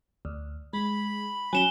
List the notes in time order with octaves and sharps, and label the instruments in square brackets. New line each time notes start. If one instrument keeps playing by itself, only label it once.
[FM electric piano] D2
[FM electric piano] G#3 [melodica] B5
[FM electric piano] F#3 C#4 [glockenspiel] G#5 E7 G7